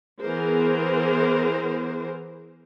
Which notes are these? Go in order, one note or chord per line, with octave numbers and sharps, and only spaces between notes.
E3 B3 G#4 A#4 C5